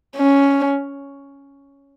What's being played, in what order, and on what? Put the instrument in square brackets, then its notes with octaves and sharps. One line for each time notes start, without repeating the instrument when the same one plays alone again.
[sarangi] C#4